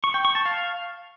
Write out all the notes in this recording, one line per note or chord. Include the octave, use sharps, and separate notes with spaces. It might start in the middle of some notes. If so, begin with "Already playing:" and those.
C#6
G5
C#6
A5
F5